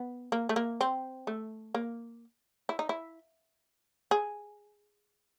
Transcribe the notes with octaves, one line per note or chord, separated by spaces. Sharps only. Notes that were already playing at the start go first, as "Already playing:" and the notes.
Already playing: B3
A#3
A3
A#3
C4
A3
A#3
E4
D#4
E4
G#4